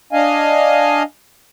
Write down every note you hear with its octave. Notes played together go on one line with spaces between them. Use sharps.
D4 D#5 F5 G#5